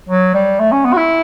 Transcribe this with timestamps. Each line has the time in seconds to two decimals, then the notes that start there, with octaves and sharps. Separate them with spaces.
0.09 F#3
0.34 G3
0.60 A3
0.72 C#4
0.85 B3
0.93 F#4
0.97 E4